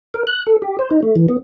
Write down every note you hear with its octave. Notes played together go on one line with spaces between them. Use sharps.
A#4
F#6
A4
G4
C5
D#4
A3
E3
B3